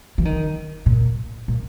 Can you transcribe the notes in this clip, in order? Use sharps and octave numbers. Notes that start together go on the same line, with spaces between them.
E3
D#3
A#2
A#2